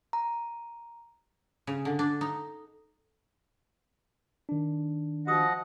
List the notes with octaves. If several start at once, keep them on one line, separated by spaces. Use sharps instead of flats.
A#5
C#3
D3
D4
D#4
D#3 D4
F3 F#4 D#5 F#5 D#6